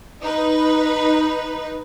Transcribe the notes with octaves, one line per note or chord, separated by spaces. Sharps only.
D#4 B4